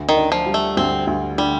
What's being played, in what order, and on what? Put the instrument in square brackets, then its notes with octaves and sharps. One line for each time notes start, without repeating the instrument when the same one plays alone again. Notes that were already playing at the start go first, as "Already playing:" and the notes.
Already playing: [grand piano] D2
[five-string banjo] D#3
[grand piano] D4
[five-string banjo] F3
[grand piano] G3
[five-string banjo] A3
[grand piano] D2 [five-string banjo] C4
[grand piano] D2
[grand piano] D3 [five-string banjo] G3